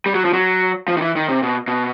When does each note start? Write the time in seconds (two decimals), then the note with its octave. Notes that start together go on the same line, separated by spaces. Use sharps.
0.06 G3
0.15 F#3
0.25 F3
0.33 F#3
0.88 F3
0.97 D#3
1.02 E3
1.16 D#3
1.29 C3
1.43 B2
1.68 B2